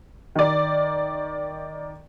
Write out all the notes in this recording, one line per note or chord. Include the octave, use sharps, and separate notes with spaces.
D#3 D5